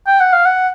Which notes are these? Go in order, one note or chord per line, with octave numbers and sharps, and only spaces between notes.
G5
F#5
F5
F#5